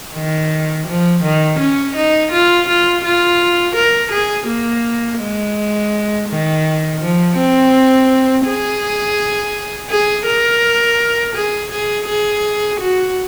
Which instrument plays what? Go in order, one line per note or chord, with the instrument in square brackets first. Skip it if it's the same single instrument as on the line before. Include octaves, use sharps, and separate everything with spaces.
[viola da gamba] D#3
F3
D#3
C#4
D#4
F4
F4
F4
A#4
G#4
A#3
G#3
D#3
F3
C4
G#4
G#4
A#4
G#4
G#4
G#4
F#4